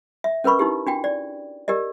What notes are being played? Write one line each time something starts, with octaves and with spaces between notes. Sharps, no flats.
E5
C#4 A#4 B4 B5 C#6
D#4 E4 G4
D4 F#4 G5
D5
G4 A#4 D5 D#5